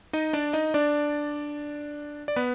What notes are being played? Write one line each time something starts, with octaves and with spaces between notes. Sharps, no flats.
D#4 D#5
D4 D5
D#4 D#5
D4 D5
D5
B3 B4